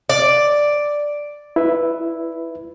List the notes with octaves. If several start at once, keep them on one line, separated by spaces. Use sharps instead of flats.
D5
E4 B4 E5